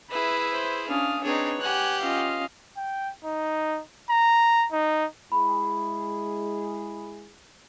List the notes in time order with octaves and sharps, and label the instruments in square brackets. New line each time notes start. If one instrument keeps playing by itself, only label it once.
[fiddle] E4 G#4 [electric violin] B4 E5
[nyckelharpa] C5
[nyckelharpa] C#4 F5 [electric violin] D4 D#6
[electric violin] C4 D4 [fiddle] D#4 G#4 [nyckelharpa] B4 C#5
[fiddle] G4 F#5 [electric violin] G#5 F#6
[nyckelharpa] C#4 F4 [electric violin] D#5 F5
[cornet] G5
D#4
A#5
D#4
[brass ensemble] G#3 E4 G#4 [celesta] B5